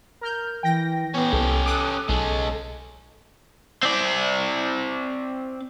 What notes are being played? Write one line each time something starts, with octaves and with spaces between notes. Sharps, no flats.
A#4 F6 G6
E3 G5 A#6
B3 C#4 G4
C2 A4
A4 D6 D#6 F#6
B1 G#3 C#4
C4 D5